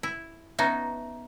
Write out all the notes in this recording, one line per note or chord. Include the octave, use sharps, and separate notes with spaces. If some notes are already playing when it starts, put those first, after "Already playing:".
E4
B3 C#4 D#4 E5 A5 A#5